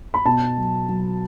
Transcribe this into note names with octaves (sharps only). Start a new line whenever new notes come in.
B5
B2 A5
F#3
F#3